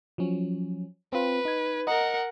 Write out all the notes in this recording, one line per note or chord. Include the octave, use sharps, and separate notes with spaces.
F3 F#3 C#4
C4 F4 B4
D#4 G#6
A#4 D#5 F#5 A#5